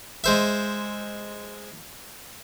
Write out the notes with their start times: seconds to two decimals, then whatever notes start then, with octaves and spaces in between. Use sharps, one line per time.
0.24 G#3 C5 E5